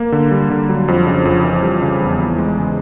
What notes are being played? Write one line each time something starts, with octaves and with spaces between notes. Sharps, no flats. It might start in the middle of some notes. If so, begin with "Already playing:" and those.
Already playing: A#3
D3
G3
D3
F#3
F2
C#3
F2
E3
G3
C#3
E2
E3
G#3
C#3